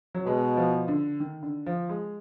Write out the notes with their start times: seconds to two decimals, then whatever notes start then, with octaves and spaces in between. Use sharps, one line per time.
0.15 F#3
0.26 B2 G#3
0.57 F3
0.88 D3
1.20 D#3
1.43 D3
1.66 F3
1.89 G#3